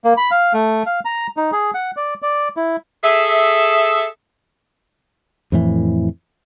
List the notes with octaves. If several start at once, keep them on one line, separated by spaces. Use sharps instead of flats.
A#3
B5
F5
A3
F5
A#5
D#4
G#4
F#5
D5
D5
E4
G#4 A4 E5
F2 A2 E3